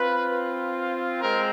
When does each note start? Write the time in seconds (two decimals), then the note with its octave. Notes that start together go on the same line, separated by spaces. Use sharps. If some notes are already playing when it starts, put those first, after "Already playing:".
Already playing: C4 F4 B4
1.21 G#3 C4 A#4